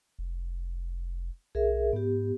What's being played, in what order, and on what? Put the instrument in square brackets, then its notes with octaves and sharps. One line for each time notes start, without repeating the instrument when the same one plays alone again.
[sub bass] F1
[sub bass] B1 [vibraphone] G#4 A#4 E5
[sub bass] G#2 [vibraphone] B3 G4